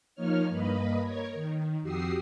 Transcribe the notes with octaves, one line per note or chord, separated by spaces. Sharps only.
F3 A#3 D#4 C#5 F6
G2 A#3 B4 D#5 B5
A#4 C#5 G#6
D#3
F2 F#4 G4 D#6 E6 C7